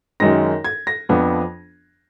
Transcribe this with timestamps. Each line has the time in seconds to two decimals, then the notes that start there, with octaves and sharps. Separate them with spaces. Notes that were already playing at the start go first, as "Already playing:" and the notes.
0.20 F#2 D#3 G#3 D#4 A#6
0.65 G#6
0.87 A#6
1.09 F2 F3 B3 D4